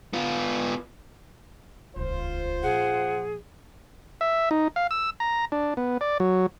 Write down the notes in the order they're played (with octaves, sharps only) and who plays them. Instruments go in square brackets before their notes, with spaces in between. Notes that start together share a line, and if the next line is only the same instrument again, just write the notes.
[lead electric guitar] B3 F4
[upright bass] D#1 C#2 [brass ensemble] F4 C5
[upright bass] A#2 F3 [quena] G#4 [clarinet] F#5
[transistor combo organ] E5
D#4
F5
E6
A#5
D4
B3
D5
F#3